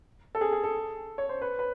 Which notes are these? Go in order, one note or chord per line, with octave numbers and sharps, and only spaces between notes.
A4
G#4
G#4
A4
C#5
C5
B4
B4